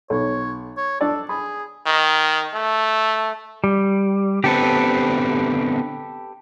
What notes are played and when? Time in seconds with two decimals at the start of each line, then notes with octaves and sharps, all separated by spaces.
0.10 B1 C#5
0.77 C#5
1.01 D4 A4 D5
1.29 G#4 B5
1.86 D#3
2.54 A3
3.64 G3
4.44 D3 B3 C4 G4 A4 B4